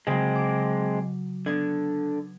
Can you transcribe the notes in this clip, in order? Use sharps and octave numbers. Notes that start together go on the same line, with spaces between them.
C#3 F#3 G#3 C4
D6
D3 B3 G#6